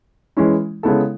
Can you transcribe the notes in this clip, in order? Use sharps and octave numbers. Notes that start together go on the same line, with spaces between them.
E3 G#3 C#4 E4
C#3 G#3 B3 E4 A4